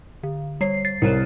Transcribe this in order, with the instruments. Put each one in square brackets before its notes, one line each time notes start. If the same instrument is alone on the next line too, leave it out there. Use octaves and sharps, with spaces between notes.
[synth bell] D3
[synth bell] G3 C7 [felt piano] C#5
[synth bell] A6 C7
[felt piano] C2 [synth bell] A#4 C5 C#5